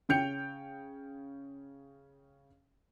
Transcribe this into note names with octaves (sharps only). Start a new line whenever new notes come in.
C#3 C#4 G5 G6 C#7 F7